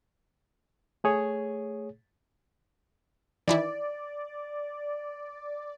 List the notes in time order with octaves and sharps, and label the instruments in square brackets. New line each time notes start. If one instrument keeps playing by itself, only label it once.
[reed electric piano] A3 G#4 C#5
[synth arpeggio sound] D#3 E3 E4 [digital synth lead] D5